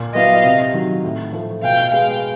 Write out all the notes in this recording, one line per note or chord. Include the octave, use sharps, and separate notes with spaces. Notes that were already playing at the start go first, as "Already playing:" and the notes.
Already playing: A#2
F#3 B3 E4 D#5 F5
C3
D#3 F#3
A2
F3 A3
B2 F5 G5
G#3 B3 F5 G5